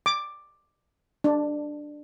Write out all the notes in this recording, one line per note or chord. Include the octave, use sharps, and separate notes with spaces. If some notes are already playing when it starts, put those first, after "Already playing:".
D6
D4